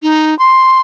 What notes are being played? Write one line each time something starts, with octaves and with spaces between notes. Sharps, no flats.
D#4
C6